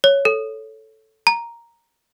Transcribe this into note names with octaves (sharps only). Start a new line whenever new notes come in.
C#5
A4
A#5